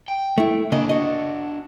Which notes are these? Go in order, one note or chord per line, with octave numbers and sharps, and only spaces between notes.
G5
A3 E4
C#3 A#3 B3 D4 D#5
F#4 D#5